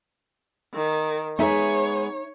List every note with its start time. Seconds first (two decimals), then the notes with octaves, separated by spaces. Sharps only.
0.74 D#3
1.39 G#3 B3 D#4 G#4 C#5 E5